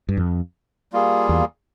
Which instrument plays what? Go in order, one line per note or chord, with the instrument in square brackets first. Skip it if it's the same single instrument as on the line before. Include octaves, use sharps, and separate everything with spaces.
[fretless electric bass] G2
F2
[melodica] G3 A#3 F4 G#4
[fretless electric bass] E2